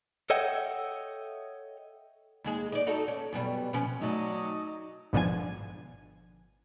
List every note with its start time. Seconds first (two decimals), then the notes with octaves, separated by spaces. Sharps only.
0.30 A4 C#5 D#5 E5 F#5 G5
2.44 D#2 G#3 G#4
2.72 D#4 D5
2.87 D#4 F#4 A4
3.08 C#4
3.32 F#2 B2 G3
3.73 B2 F3 C#4
4.01 F#3 A3 D#4 D5 D#5 G#5
5.13 G#1 B2 D3 F3 G#5